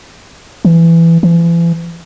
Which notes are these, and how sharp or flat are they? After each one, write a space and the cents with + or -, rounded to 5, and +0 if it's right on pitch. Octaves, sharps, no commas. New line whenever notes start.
E3 +15
E3 +40